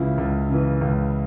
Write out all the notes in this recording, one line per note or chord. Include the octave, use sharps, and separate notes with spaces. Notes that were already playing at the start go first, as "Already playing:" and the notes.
Already playing: C#2 C#3 E3 E4 F4
C#2
C#3 E3
C#2